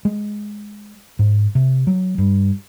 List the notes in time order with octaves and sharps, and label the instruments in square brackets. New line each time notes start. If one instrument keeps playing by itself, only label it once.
[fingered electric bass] G#3
G#2
C3
F#3
G2